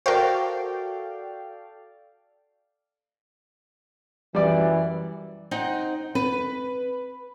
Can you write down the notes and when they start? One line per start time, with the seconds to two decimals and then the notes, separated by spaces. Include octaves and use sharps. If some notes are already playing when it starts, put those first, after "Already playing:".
0.06 F#4 A4 A#4 C5 D5 F5 G5
4.35 F#2 E3 G3 D5
5.51 C4 D#4 F#5
6.15 C4 B4